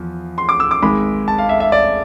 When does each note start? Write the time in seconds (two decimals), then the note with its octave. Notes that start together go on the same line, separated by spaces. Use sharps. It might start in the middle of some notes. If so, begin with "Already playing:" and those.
Already playing: E2 F3
0.38 C6
0.49 D6
0.60 E6
0.71 D6
0.82 G#1 G#2 G#3 B5
1.28 A5
1.38 F5
1.49 E5
1.60 E5
1.72 D5